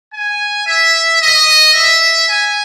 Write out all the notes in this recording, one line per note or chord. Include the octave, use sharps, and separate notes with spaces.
G#5
E5
D#5
E5
G#5